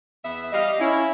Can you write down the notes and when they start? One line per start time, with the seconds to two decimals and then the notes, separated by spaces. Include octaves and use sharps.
0.24 E2 B3 E5
0.52 G3 D#5 F5
0.80 C#4 E4